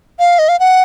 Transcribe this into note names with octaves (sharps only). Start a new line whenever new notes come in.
F5
D#5
F5
F#5